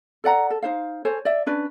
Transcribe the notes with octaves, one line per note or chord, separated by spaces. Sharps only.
A4 D5 F#5 A#5
A4
D#4 C5 F5
A4 C5 C#5 G#5
D5 E5
C#4 D4 B4 D5